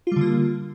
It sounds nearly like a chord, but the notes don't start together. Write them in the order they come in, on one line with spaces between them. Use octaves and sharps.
F4 G3 D3 A#3